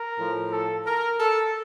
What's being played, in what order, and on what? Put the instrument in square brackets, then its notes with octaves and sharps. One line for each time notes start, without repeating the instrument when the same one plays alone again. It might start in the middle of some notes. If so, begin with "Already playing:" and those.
Already playing: [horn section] A#4
A2 F3
A4
A#4
A4